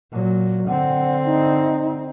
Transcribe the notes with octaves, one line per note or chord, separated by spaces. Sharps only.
A#2 F#3
D3 C4 F#5
D#4